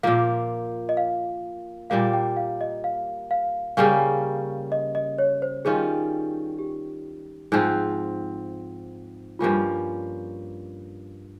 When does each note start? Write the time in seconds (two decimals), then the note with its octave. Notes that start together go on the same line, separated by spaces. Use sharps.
0.03 A#2 F3 A#3 F5
0.89 D#5
0.97 F5
1.90 A#2 G3 A#3 F5
2.13 G5
2.37 F5
2.61 D#5
2.84 F5
3.31 F5
3.77 C#3 G3 A#3 C#4 F5
4.72 D#5
4.95 D#5
5.18 C#5
5.42 C5
5.65 D#3 G3 C#4 F4 G#4
6.59 G4
7.52 G#2 F3 C4 D#4
9.39 G2 F3 A#3 C#4 F4